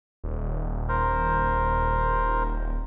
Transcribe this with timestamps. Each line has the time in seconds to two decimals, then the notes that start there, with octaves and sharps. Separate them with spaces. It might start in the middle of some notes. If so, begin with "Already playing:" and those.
0.24 D#1
0.89 A#4 C5